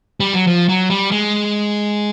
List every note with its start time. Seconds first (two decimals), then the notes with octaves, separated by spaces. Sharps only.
0.20 G3
0.33 F#3
0.47 F3
0.69 F#3
0.90 G3
1.11 G#3